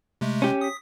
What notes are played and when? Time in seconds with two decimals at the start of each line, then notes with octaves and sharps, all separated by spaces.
0.21 C3 G#3 A3
0.42 C#4 G4
0.61 D#6 B6